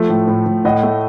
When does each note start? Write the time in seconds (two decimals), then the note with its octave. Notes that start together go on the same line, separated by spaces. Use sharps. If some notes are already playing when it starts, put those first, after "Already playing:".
Already playing: F3 A3
0.09 A2
0.28 A2
0.46 A2
0.65 A2 D#5 F#5
0.83 A3